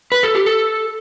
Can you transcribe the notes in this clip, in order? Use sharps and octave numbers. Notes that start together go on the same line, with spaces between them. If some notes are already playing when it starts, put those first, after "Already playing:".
B4
A4
G4
A4